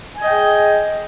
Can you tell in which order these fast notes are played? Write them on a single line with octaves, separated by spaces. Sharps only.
G#5 D#5 G5 G#4